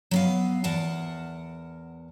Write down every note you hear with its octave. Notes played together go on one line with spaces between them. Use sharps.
F#3 B3 F5
E2 A#4 F#5 A5